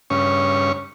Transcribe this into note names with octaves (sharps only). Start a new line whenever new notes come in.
G2 C#3 C#4 C#6